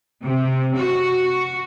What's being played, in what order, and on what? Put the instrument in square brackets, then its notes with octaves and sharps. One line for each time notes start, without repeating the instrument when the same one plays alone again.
[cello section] C3
F#4